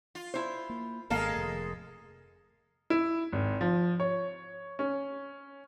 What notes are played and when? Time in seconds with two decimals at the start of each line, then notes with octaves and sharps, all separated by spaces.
0.15 F4
0.34 E4 C5
0.69 A#3
1.10 G#1 G#3 A#3 A4 F5
1.37 F1
2.90 E4
3.33 G#1
3.61 F3
4.00 C#5
4.79 C#4